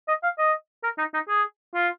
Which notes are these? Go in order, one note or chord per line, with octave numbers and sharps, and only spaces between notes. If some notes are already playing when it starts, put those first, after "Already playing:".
D#5
F5
D#5
A#4
D#4
D#4
G#4
F4